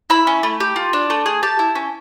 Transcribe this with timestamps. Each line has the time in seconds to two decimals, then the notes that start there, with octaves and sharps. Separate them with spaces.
0.10 E4 B5
0.27 C#4
0.43 A3
0.60 G4
0.76 F4
0.93 D4
1.10 A3
1.26 G#4
1.43 G4 A5
1.59 E4
1.75 C#4